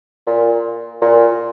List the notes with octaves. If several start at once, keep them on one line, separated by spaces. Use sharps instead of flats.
A#2
A#2